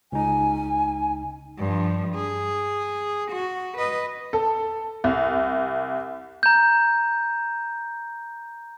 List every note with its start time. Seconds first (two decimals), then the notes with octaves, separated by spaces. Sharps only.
0.12 C#2 D#4 G#5
1.58 G2 F3
2.15 G#4
3.31 F#4
3.77 B4 D#5
4.33 A4
5.04 C2
6.43 A#5 G6